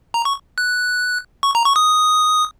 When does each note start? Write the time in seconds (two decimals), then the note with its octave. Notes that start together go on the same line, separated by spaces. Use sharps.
0.14 A#5
0.25 C#6
0.58 F#6
1.43 C#6
1.55 A#5
1.65 C#6
1.76 D#6